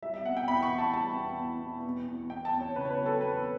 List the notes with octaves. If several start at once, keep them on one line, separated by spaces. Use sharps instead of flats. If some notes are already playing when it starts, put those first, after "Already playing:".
G3 E5
E5
B2 F#5
G5
E2 B5
C#6
E2
A5
G3 A5
E2
E2
B2
E2
E2
E2 G5
A5
E2
C#5
C#3 B4
C#5
B4
F#3
A4
E2 B4